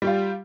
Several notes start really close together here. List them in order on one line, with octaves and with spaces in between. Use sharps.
G3 G4 F4